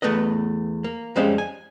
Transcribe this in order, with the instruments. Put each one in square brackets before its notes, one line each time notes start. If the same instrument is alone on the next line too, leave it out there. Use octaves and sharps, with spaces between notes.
[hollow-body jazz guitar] E2 A3 B3 B4 D#5
A#3
F2 G3 G#3 C#4 C5 F5
G#5